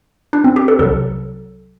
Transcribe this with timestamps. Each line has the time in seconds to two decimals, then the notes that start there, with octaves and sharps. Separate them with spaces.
0.33 D4
0.44 C4
0.56 G4
0.68 A4
0.79 C2 C3 F#3 A4